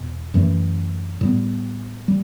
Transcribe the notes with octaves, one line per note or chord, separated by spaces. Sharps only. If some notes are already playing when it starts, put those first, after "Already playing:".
Already playing: E2 B2
F#2 E3 A3
A2 G3 B3
G3